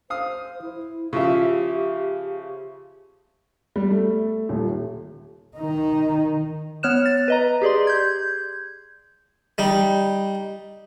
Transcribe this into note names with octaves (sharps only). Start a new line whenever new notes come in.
C5 F5 D#6
E4
C#3 F3 G4 E5
G3
A3
D#1
D#3 D#4
B3 C#5 F6 F#6 E7
A6
B4 D#5 A#5
G4 G#4 D5 C6
G6 G#6
G3 D#4